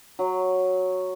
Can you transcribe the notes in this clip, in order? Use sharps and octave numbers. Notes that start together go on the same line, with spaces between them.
F#3